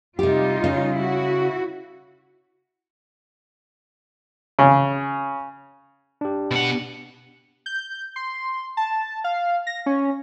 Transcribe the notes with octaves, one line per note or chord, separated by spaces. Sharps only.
C3 G3 D#4 F4 G4
C#3 C#4
E4 F#4
C#3
D4 G4
B2 F#5
G6
C6
A5
F5
A#6
C#4